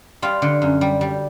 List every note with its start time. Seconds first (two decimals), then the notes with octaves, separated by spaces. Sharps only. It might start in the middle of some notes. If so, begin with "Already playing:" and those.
0.22 G3 F4
0.42 D3
0.62 F#2
0.81 G3
1.01 G3